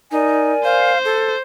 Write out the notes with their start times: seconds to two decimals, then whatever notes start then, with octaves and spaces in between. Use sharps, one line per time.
0.11 D#4 A#4 D5 G#5
0.64 C5 F5
1.05 A4